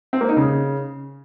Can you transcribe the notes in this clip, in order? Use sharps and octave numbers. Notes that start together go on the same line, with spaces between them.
C4
A#3
D#4
C#3